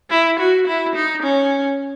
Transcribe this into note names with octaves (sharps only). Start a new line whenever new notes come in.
E4
F#4
E4
D#4
C#4